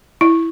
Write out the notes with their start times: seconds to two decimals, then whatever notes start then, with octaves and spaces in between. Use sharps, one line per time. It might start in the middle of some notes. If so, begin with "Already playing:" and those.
0.21 E4